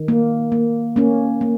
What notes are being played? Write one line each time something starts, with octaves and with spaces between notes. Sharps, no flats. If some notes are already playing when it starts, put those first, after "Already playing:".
Already playing: D#3
A#3
A#3
A#3 C#4
A#3